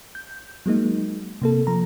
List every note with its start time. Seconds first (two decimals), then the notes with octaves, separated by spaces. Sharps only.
0.15 G6
0.66 F#3 G#3 A#3 D#4
1.42 C3 A#3 A4
1.67 F3 A#5